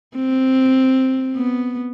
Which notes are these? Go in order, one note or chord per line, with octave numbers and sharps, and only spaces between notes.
C4
B3